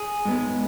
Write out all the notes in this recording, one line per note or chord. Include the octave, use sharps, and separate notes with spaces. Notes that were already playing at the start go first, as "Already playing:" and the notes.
Already playing: G#4
G#2 G#3 B3